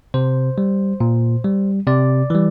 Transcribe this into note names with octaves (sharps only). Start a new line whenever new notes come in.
C3 C5
G3
A#2
G3
C3 D5
E3 G3